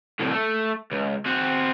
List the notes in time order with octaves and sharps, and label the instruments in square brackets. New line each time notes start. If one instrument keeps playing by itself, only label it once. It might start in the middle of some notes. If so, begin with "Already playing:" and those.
[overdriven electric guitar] C2 A2
A3
C#2
C4 F#4